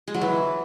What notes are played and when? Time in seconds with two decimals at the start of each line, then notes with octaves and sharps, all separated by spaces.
0.08 G#3
0.14 F#3
0.21 E3